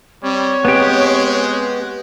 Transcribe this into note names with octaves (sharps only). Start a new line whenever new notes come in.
G3 C4 C#5
G#3 B3 G4